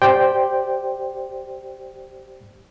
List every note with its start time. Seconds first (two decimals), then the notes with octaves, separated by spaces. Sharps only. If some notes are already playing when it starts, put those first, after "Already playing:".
0.02 G4 C5 D5 G5